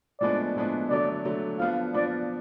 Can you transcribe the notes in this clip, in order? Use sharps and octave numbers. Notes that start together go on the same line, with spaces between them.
A2 F3 G#3 B3 D4 D5
A2 F3 G#3 B3 D4
D3 F#3 A3 D5
D3 F#3 A3
F3 B3 D4 F5
F3 B3 D4 D5